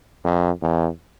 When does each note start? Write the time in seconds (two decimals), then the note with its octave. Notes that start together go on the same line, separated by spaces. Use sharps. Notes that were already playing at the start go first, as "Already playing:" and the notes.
0.24 F2
0.62 E2